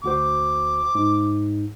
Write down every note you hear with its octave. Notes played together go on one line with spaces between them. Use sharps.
D2 F#4 C5 D6
G#2